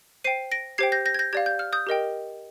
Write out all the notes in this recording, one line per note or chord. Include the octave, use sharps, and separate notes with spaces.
C5 G5 C7 D#7
A#6 D7
G4 C5 G5 G#6 C7
G6 A#6
G6 A#6
G#6
G6 A#6
G4 D5 F5 G#6
G6
F6
D#6 G6
G4 A#4 D#5 G5